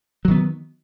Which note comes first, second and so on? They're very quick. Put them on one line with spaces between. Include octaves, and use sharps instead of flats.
F#3 D#3 B3